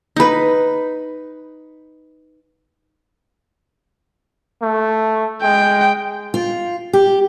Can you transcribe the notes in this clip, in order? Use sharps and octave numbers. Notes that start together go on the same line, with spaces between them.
D#4 B4
A3
G#3 G5
F4
G4